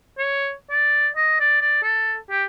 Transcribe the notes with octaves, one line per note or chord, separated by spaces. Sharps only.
C#5
D5
D#5
D5
D5
A4
G4